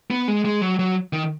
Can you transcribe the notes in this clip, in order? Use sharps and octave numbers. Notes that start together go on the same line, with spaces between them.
B3
G#3
G#3
F#3
F#3
D#3